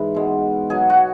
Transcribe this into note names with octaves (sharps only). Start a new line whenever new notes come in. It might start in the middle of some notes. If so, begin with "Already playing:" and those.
Already playing: G#2 E3
B2 G#3
B2 F#3 G#4
F#4